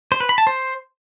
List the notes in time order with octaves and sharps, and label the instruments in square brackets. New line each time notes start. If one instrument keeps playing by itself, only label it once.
[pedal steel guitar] C5
B4
B5
A5
C5